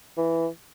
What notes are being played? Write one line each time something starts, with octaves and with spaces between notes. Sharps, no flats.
E3